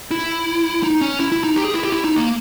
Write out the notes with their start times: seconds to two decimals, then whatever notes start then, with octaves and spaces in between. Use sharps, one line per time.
0.11 E4
0.83 D#4
1.01 C#4
1.20 E4
1.32 E4
1.44 D#4
1.56 G4
1.65 G#4
1.74 E4
1.83 G4
1.92 E4
2.04 D#4
2.16 A#3